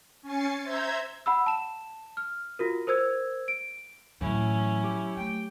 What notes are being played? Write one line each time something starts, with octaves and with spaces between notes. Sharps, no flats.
C#4 G#5 A6 C7 C#7
C5 E5 A#5 E6 G6 G#6
F#5 B5 E6
A5 E7
F6
F4 F#4 A#4
A#4 C5 E6 G#6
D7
A2 E3 F#3 C#4 E4
G4
A3 G5